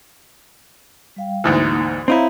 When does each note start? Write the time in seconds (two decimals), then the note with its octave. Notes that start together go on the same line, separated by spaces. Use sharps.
1.16 G3 F5 G5
1.44 D2 G#2 E3 A#3 D#4 D#6
2.08 C4 D#4 E4 C#5 F5 A#5